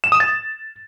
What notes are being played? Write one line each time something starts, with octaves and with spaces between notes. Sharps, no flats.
E7
D#6
A6